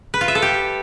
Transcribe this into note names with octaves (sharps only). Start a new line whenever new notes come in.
B4
F4
E5
A4
G4